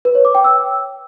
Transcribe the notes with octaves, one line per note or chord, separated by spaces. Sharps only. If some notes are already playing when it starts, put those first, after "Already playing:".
B4
C#5
D6
G5
E6